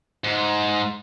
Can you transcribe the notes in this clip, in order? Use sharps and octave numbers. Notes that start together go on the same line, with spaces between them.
G#2